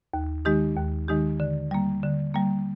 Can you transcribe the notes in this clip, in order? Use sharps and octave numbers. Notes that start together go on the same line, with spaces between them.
D#2
D#3 G#3 D#4 G4
D#2
D#3 G#3 D#4 G4
D3
G3 A#3
D3
G3 A#3